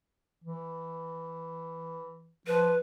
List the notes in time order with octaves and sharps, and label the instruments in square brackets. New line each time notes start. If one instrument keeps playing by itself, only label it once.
[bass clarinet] E3
[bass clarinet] F3 [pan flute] B4